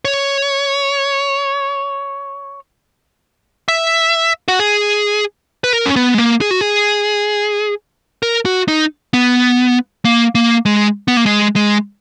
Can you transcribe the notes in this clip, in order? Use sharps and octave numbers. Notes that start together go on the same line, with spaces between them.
C#5
E5
F#4
G#4
B4
A#4
C#4
B3
G#3
A#3
G#4
F#4
G#4
A#4
F#4
D#4
B3
A#3
A#3
G#3
B3
A#3
G#3
G#3